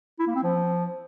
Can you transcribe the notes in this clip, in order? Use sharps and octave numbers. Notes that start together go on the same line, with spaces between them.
E4
A#3
C4
F3